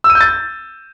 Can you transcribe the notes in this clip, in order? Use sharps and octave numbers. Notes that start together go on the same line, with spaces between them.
E6
D#7
G6
A6